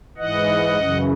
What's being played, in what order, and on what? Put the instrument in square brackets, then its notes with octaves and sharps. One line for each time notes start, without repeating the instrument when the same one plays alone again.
[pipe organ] G#2 E3 D#5 F#5
F#2 C#3 E3